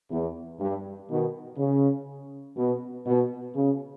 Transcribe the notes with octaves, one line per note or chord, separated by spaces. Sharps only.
E2
G2
B2 D#3
C#3
B2
B2
C#3